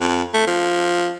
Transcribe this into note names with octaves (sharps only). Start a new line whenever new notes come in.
F2
A3
F3